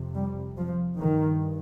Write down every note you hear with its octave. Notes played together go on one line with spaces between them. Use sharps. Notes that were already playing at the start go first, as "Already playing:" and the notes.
Already playing: F2 C3
G3
F3
G2 D#3